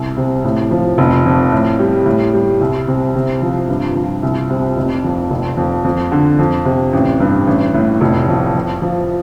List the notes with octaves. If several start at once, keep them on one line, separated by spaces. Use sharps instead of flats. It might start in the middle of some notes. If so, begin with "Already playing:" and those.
Already playing: C2
C3
A2
F3
F1
F2
A2
G3
A2
G3
C2
C3
C3
F3
G2
F3
C2
C3
F1
F2
F1
F2
F2
D3
F2
C3
A1
G2
A1
A2
F1
F2
F2
F3